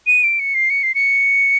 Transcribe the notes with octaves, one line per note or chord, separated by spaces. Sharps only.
D#7
D7
C#7
C7
C#7
C7
C#7